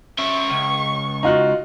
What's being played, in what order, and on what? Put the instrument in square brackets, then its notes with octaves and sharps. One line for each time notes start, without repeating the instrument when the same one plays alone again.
[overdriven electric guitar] C#4 E5 [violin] C#6
[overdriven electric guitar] C#2
[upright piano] D#4 F4 F#4